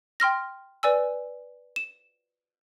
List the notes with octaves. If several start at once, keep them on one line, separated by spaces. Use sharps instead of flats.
G5 C6 F6 A#6
B4 D5 G#5 E6
E7